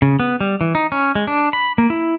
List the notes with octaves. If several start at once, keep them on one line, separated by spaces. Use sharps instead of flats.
C#3
B3
G3
E3
D#4
C#4
G#3
D4
B5
A#3
E4